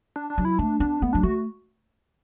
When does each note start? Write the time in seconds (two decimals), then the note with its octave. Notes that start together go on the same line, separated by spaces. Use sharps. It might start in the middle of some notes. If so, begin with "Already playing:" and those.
0.16 D4
0.30 D4
0.38 F#3
0.45 E4
0.59 A3 D4
0.80 B3 D4
1.02 A3 B3
1.13 F#3 D4
1.23 A3 F#4